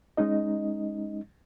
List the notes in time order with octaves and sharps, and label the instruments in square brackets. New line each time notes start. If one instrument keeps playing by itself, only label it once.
[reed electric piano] G#3 C#4 D#4 D#5